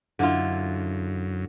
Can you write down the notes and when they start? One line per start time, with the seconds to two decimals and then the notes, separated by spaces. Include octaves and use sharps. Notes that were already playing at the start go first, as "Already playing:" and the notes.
0.19 F#2 D3 E4 F4